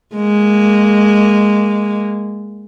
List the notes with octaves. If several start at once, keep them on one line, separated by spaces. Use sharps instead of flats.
G#3 A#3